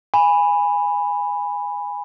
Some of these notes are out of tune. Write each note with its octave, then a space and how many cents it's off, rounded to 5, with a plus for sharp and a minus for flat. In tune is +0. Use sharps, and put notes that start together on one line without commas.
G#5 -15 B5 +0